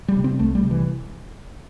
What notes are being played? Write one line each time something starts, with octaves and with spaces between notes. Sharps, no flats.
G3
C3
C4
C2 A3
G3
C3
E3